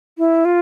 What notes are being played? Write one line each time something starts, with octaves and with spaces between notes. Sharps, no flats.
E4
F4